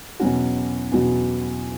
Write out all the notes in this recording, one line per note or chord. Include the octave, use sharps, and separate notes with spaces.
E2 B2 F#3 C#4 F#4
E2 B2 F#3 C#4 F#4